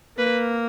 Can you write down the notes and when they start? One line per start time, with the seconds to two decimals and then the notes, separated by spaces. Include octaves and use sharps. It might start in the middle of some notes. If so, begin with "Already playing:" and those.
0.17 A#3 B4